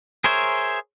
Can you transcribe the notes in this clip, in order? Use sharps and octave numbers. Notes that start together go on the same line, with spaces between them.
G#4 A#4 C5 C#5 E5